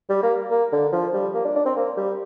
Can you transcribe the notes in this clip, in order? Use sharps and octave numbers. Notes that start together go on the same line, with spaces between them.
G3
A#3
A#3
D3
F3
G3
A#3
D4
D4
C4
A#3
G3